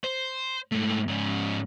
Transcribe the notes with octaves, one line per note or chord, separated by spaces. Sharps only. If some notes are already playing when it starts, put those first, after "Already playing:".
C5
G#2 A3
G#2 C#4